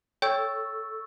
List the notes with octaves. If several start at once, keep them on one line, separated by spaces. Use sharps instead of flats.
A4 C#5 G5 C#6 E6 G6